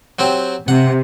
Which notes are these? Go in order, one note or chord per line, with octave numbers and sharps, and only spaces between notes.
F#3 C4 G4
C3 F#5